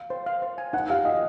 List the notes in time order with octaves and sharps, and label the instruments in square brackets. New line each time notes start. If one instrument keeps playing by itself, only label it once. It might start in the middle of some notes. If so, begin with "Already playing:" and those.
Already playing: [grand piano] F5
[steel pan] C5
F5
C5
G#5
[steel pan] D#4 [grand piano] F#5
[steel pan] G4 [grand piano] F5
[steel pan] D#4 [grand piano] D#5